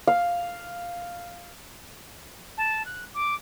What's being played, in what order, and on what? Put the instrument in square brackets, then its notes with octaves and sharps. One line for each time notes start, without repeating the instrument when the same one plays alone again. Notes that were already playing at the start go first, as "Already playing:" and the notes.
[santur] F5
[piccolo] A5
F#6
D6